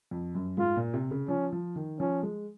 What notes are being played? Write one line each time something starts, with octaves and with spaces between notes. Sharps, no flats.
F2
F#2
G#2 F4
A#2
C3
C#3
F3 C#4
F3
D#3
F3 C#4
G#3